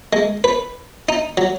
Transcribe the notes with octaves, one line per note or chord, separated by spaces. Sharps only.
G#3
B4
D#4
F#3